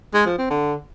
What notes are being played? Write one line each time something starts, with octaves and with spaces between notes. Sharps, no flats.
G#3
F3
C4
D3